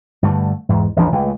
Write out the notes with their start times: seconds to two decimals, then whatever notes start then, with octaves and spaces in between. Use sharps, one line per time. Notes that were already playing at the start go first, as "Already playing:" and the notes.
0.23 G2 D3 A3
0.69 E2 G#2
0.96 A1 E2 F3 D4
1.12 C#2 G#3 A3